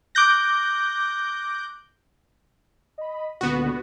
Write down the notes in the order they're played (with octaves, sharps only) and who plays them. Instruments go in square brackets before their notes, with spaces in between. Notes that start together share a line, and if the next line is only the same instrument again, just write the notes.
[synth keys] D6 F#6 G6 A#6
[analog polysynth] D#5 B5
[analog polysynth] C#2 A#2 D3 [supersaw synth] B3 F#4